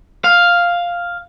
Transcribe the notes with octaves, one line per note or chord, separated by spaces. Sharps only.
F5